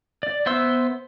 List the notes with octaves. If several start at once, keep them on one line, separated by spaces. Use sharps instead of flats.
D5
B3 C5 E5 C6 E6